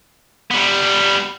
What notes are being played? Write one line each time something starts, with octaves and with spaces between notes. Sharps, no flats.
G3 B3